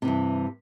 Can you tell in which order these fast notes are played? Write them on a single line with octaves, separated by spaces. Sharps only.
C3 E3 G2